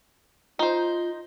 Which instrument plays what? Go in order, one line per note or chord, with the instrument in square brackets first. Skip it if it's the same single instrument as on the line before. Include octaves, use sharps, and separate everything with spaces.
[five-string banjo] D#4 C5 [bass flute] F4